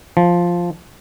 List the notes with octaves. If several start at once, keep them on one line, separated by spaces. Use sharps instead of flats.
F3